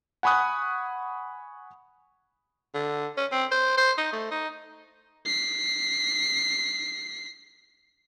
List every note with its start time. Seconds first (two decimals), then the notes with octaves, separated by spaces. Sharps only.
0.23 F#5 G#5 B5 C#6 D#6 F#6
2.74 D3
3.17 C#4
3.32 C4
3.51 C5
3.77 C5
3.98 D#4
4.12 A3
4.31 D#4
5.25 B6 C7